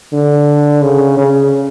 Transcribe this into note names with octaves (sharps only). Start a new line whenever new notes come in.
D3
C#3
C#3